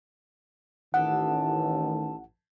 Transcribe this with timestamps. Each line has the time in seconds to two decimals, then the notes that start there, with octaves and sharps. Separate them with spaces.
0.94 A1 D#3 B3 D4 A4 F#5